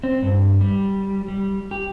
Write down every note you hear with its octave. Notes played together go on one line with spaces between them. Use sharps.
C4
G2
G3
G3
G4